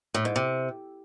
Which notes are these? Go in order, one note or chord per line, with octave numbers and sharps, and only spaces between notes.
A2
G#2
C3